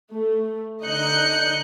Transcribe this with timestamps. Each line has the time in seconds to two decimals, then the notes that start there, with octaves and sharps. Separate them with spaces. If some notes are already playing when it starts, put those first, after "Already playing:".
0.11 A3
0.83 D3 D#4 D#5 F#6 G6 C#7